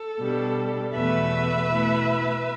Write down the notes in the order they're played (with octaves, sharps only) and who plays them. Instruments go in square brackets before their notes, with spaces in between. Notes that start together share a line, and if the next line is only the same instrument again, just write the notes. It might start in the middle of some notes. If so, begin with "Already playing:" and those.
Already playing: [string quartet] A4
B2 G3 D4
E2 B2 A3 B4 E5
B2 A3 E4